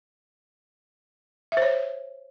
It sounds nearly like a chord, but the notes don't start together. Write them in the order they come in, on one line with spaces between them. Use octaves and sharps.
E5 C5 C#5